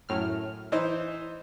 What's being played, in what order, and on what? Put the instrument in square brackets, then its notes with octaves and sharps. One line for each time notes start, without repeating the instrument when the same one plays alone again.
[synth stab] F#2 A2 F6
[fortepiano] E3 D#4 C5